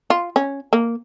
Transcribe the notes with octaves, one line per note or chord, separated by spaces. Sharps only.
F4
C#4
A#3